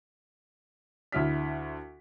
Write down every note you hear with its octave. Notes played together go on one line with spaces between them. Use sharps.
D2 E4 F6 B6